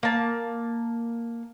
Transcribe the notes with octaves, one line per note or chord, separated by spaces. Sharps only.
A#3 A5